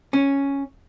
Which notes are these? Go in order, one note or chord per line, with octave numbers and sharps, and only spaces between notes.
C#4